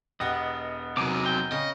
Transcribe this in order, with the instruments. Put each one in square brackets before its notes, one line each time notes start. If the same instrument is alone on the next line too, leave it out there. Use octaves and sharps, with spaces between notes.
[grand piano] E1 G4 F#5 [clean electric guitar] B3 [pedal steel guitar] D#5
[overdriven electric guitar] C3 F#3 [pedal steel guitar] A#4 G#5 D6
[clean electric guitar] G5
[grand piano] C#3 [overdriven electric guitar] D#5